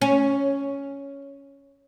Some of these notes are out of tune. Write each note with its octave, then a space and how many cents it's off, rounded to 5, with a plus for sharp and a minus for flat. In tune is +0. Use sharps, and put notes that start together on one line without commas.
C#4 +5